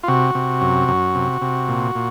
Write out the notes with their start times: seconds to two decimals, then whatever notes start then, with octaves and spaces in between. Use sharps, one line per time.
0.03 F4
0.08 C3 F#4
0.35 C3
0.61 F#2
0.88 F#2
1.15 C3
1.41 C3
1.68 A#2
1.95 A#2